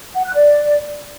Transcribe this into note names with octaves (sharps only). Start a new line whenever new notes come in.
F#5
F#6
D5